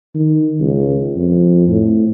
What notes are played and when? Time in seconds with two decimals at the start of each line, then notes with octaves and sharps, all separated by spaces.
0.15 D#3
0.60 C#2
1.17 F2
1.68 A2